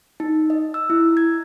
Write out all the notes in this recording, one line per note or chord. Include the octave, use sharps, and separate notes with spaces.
D#4
D#5
E6
E4
G#6